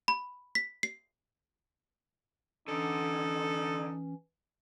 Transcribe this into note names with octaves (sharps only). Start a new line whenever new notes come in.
B5
B6
C7
D3 E3 C#4 D#4 A4